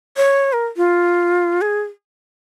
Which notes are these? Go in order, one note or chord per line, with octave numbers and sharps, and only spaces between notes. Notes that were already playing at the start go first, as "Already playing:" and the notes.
C#5
A#4
F4
G#4